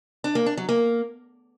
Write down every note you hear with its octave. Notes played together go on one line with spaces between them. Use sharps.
D4
A#3
D4
F#3
A#3